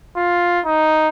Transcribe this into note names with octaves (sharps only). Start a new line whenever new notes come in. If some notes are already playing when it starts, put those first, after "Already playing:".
F4
D#4